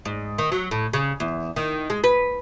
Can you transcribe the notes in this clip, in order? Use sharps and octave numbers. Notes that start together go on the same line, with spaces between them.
G#2
D#3
F#3
A2
C#3
E2
D#3
G#3
B4